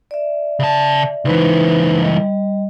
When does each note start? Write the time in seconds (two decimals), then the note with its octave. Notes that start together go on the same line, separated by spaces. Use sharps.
0.11 D5 E5
0.59 C#3 A5
1.25 C#2 E3 D#4 B4 C5
2.01 G3 D#5